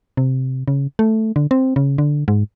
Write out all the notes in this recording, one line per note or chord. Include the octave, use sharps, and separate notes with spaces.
C3
C#3
A3
D3
C4
C#3
D3
G#2